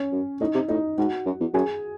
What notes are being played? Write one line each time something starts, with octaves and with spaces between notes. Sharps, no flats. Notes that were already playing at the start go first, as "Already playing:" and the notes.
Already playing: C#4 C#5
F#2
A2 D#4 D#5
C3
A2 D#4 D#5
G#2 F#4 F#5
F#2
E2
F#2 G#4 G#5